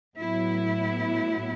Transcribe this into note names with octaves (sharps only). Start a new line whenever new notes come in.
A2 F#3 B3 E4